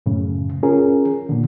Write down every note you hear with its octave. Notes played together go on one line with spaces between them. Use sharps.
F#2 A2 C#3
C#4 F4 G#4 A#4
A#2 D3